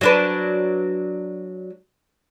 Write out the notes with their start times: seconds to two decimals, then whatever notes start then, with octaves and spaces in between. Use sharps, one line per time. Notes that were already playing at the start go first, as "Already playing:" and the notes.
0.01 F#3 D4 B4